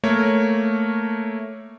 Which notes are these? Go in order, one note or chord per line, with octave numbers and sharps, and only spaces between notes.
A3 A#3 A#4 C#5